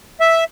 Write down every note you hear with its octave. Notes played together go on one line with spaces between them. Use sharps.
E5